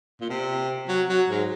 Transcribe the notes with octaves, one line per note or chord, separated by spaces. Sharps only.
A#2
C3
F#3
F#3
G#2